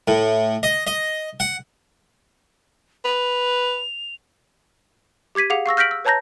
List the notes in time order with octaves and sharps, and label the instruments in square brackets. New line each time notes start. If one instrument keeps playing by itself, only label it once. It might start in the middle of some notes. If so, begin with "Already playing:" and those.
[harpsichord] A2
D#5
D#5
F#5
[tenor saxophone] B4 [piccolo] F7
[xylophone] G4 D6 G#6 B6 D#7
G#4 F5 F#5 D6 F7
F5 C#6 E6 A#6
F6 G6 A#6 B6 D7 F#7
E6
B4 C#5 A5 A#5 G6 A#6